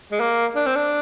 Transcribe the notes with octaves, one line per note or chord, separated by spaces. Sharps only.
G#3
A#3
D4
C4
D4